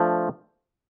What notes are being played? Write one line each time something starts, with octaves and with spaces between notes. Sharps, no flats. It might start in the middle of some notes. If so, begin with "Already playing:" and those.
Already playing: F3 A3 D4